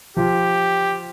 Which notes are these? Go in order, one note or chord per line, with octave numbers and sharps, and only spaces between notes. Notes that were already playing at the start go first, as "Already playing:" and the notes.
F3 F4 G4